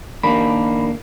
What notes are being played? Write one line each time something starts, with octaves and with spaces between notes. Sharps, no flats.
D#3 A#3 D4 B5